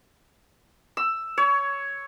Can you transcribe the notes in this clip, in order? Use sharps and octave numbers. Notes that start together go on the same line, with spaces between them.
E6
C#5